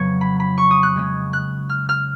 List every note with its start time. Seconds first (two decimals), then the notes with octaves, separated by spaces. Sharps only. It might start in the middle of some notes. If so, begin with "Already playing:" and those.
Already playing: F2 C#3 F#3 B3 B4 C#5
0.21 B5
0.40 B5
0.58 C#6
0.71 D#6
0.83 F#6
0.96 C#3 G#3 C#4
1.33 F#6
1.70 F6
1.89 F6